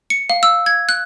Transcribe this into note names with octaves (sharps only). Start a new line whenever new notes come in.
C#7
F5
E6
G#6
F#6